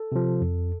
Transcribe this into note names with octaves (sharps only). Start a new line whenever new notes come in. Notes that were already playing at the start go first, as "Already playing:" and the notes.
Already playing: A4
C3 F3
F2